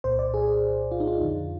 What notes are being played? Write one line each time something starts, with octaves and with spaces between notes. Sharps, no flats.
C2 A#2 C5
D5
G#4
F4
D#4
F4
F2 D3